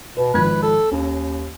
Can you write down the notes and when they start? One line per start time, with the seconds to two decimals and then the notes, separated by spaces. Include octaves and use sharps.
0.17 B2 B4
0.34 G#1 F3 B4 G#6
0.63 A4
0.91 D#2 C#4